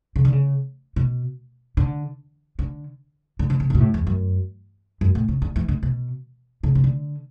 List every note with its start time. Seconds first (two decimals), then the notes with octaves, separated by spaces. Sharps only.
0.16 C#3
0.25 D3
0.32 C#3
0.96 B2
1.77 D3
2.59 D3
3.39 D3
3.50 D3
3.60 C#3
3.70 C#3
3.75 B2
3.80 A2
3.94 E2
4.07 F#2
5.01 F#2
5.15 A2
5.28 C#3
5.42 D3
5.56 E3
5.68 D3
5.83 B2
6.63 C#3
6.75 C#3
6.84 D3